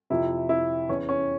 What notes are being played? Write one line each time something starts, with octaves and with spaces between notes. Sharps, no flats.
F2 C3 F3 E4
E4
E2 E3 C#4
C#4